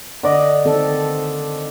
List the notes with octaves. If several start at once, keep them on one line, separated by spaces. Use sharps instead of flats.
D3 D5 D#5
D#3 C4 A4